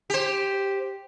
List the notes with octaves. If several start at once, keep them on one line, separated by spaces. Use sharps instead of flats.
G4 C5